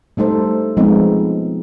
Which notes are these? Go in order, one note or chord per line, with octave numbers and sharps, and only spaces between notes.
G3 A3 D#4 A4 C5
F3 G#3 B3 C4 D#4